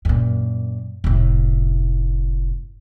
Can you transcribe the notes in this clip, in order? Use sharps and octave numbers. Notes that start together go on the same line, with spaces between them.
F#2 A#2
F1 A2